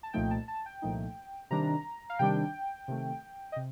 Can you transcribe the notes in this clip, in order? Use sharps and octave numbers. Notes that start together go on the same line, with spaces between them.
A5
C2 A#2 F3 A3 D#4 G5
A5
A5
G5
C2 A#2 F3 A3 D#4
C3 D#3 G3 D4 A#5
F5
C3 D#3 G3 D4 G5
C3 D#3 A3
D#5
C3